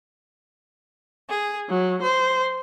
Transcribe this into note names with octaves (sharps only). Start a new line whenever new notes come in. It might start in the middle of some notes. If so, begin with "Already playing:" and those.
G#4
F#3
C5